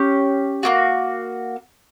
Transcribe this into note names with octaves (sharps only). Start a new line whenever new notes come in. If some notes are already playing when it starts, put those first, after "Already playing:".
Already playing: C#4 G4
A#3 D4 F#4